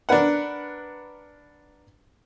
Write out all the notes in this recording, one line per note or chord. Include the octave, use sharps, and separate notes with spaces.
D4 A#4 B4 F#5